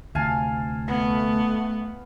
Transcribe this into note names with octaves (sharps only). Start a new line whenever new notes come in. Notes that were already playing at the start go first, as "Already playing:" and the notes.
D2 C3 F5 G#5 A5
A3 B3